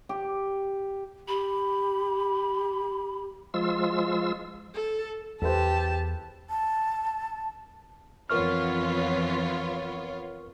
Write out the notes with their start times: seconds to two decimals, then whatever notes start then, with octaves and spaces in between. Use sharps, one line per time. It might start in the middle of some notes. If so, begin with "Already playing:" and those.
0.09 G4
1.28 G4 B5
3.54 F3 G#3 F4 E6
4.74 A4
5.42 E2 G4 A4 B4 C5 A5
6.50 A5
8.30 F2 E3 B3 F4 A#4 C#5 C#6 F6